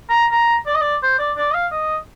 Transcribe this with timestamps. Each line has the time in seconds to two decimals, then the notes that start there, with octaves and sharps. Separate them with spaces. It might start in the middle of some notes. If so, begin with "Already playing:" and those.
0.10 A#5
0.32 A#5
0.67 D5
0.75 D#5
0.81 D5
1.03 C5
1.19 D5
1.37 D5
1.51 D#5
1.54 F5
1.72 D#5